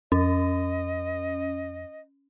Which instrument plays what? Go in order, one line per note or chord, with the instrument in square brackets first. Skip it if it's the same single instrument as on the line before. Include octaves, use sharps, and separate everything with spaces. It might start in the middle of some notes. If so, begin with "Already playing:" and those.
[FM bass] F2 [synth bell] C#4 [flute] D#5